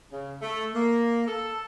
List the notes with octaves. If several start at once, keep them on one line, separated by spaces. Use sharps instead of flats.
C#3
A3
A#3
A4